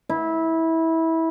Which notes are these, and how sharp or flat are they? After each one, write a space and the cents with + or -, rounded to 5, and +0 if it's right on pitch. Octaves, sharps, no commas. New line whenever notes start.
E4 -20